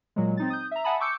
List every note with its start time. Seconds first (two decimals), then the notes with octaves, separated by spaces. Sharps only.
0.16 A#2 F#3 G#3
0.37 C4 D#4 A6
0.50 D#6 G6
0.71 E5 A#5
0.84 E5 F#5 G#5 A5 B5 D#6
1.00 C#6 D6 E6 G6 C#7